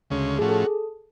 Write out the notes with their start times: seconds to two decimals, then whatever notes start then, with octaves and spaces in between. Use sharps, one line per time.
0.10 D2 C#3 G#3 C#4
0.39 A2 F3 A3 C#4 F#4 G#4
0.49 A4